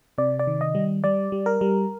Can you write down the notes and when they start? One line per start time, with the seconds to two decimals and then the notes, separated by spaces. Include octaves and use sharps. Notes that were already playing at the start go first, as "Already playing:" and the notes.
0.18 C3 D5
0.39 D5
0.47 D#3
0.61 D#5
0.75 G3
1.04 G3 D5
1.32 G3
1.46 A#4
1.61 G3